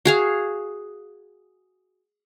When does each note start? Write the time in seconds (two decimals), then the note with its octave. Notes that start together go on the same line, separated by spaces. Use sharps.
0.05 F#4 G#4 F5